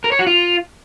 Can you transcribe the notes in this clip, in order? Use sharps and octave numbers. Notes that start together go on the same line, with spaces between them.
A#4
C#5
F#4
F4